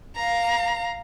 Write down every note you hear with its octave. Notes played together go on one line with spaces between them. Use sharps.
F5 A#5